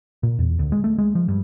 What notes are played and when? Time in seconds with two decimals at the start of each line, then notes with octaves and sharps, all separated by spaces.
0.23 A#2
0.39 E2
0.59 D2
0.72 G#3
0.84 A3
0.98 G#3
1.15 F3
1.28 G2